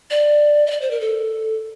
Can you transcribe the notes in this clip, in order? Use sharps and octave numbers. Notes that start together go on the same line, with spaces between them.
D5
D#5
D5
C5
A#4
A4